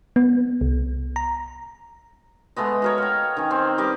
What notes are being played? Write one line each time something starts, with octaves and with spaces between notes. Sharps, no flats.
B3
C2
A#5
G#3 A3 B3 D#5
F#4 A#4 C#5
F5 G5
D#3 C#4
C4
G3 B4 D#5 D6